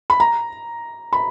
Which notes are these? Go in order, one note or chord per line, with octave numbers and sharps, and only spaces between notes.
B5
A#5
B5